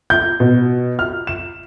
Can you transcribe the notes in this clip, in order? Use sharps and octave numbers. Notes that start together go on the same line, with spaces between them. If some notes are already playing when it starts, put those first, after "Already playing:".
G6
B2
F6
E7